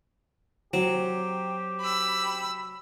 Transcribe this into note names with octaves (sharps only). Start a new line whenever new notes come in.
F#3 C4 G4
B5 E6